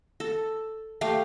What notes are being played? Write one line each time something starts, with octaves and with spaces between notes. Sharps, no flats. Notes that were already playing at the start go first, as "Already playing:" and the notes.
A4
A3 G4 F5